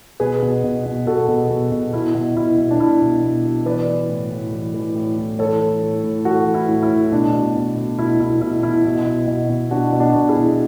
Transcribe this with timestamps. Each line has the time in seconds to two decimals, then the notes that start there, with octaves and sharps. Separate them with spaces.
0.20 B2 G#4 B4
0.42 B2
0.64 B2
0.86 B2
1.07 B2 F#4 A4
1.28 B2
1.50 B2
1.72 B2
1.93 B2 E4
2.15 B2
2.36 B2 E4
2.58 B2
2.71 D4
2.79 B2 E4
3.02 B2
3.23 B2
3.45 B2
3.66 E3 B4 D5
3.87 E3
4.09 A2
4.31 A2
4.53 E3
4.74 E3
4.95 A2
5.18 A2
5.39 E3 A4 C#5
5.61 E3
5.83 A2
6.04 A2
6.25 E3 F#4 A4
6.47 E3
6.54 E4
6.69 A2
6.83 E4
6.91 A2
7.12 B2 D4
7.33 B2
7.56 B2
7.76 B2
7.98 B2 E4
8.20 B2 E4
8.41 B2 E4
8.63 B2 E4
8.85 B2
9.06 B2
9.27 B2
9.49 B2
9.71 B2 D4 F#4
9.93 B2
10.00 D4 F#4
10.15 B2
10.29 E4 G#4
10.36 B2